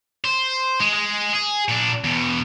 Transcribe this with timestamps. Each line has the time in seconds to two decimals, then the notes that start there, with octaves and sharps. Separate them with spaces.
0.25 C5
0.80 G#3
0.93 G#3
1.33 G#4
1.69 A#2 D4
2.04 E2 B2